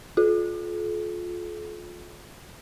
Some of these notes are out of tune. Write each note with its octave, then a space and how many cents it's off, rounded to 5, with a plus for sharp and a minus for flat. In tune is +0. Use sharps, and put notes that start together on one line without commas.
F4 +20 A4 -45